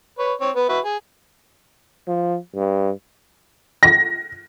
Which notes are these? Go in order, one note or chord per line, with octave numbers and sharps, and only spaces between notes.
B4 C#5
C4 C#5
B3 B4
F#4 B4 E5
G#4
F3
G2
A#6